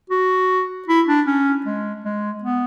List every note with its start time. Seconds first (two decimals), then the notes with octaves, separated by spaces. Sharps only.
0.10 F#4
0.88 E4
1.07 D4
1.26 C#4
1.66 G#3
2.04 G#3
2.43 B3